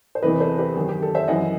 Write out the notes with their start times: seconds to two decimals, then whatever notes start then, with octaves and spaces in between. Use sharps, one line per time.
0.15 C5
0.23 E2 C3 E3 B4 D#5
0.40 A4 C5
0.58 G4 B4
0.75 F#2 D#3
0.89 G4
1.03 A4
1.15 C5 E5
1.28 F#2 E3 D#5 F#5